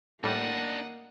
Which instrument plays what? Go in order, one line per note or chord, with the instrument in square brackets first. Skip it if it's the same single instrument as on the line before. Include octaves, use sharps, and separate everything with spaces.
[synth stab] A2 G3 [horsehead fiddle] A#3 [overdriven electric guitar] D4 D#4 [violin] D#5 F#5